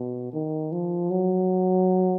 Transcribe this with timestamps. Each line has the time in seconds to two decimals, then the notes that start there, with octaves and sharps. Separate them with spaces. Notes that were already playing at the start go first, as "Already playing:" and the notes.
Already playing: B2
0.33 D#3
0.72 F3
1.11 F#3